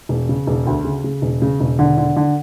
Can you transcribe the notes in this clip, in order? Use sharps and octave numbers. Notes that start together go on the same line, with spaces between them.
E1
C#3
E1
D2
C#3
C#3
E1
C#3
E1
D3
D3
D3